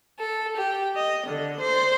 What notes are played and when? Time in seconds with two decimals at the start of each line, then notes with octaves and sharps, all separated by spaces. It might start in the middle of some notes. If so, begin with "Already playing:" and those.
0.19 A4
0.56 G4
0.95 D#5
1.26 D3
1.59 C5